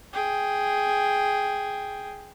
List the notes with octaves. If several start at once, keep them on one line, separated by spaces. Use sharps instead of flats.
G#4 G5